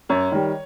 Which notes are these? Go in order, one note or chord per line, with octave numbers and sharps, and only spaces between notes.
F#2 C#5
D#3 G3